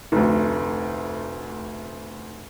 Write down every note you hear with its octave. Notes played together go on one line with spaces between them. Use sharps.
F1 D2